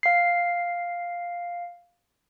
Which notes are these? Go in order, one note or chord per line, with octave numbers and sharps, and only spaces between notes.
F5 C7